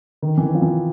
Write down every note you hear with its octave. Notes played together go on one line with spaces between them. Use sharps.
D#3
E3
D#3
F3
E3